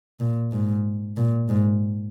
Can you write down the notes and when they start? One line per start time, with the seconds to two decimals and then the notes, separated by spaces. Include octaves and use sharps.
0.20 A#2
0.52 G#2
1.17 A#2
1.49 G#2